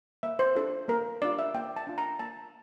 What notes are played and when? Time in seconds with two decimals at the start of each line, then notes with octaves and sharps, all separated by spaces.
0.23 A#3 E5
0.39 C5
0.55 D4 F4 A4
0.88 A#3 A#4
1.22 D4 F4 D5
1.39 E5
1.54 A#3 G5
1.76 A5
1.87 D4 F4
1.98 A#5
2.19 A#3 A5